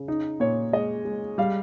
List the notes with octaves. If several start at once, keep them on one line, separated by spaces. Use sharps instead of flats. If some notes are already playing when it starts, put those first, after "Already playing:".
Already playing: C#3
D#4
A#2 C#5
G#3 D#5
G#3
G3 F5